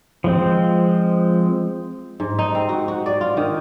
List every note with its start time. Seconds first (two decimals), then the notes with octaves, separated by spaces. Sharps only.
0.24 F3 G#3 C4
2.20 G#2
2.39 D#4
2.55 C4
2.69 F#4
2.88 F#4
3.06 D5
3.21 F4
3.37 D#3